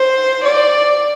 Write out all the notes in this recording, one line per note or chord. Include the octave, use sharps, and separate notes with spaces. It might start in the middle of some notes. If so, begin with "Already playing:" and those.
Already playing: C5
D5